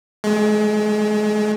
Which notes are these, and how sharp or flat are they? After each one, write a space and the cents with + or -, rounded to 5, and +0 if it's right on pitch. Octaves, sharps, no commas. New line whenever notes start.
G#3 +35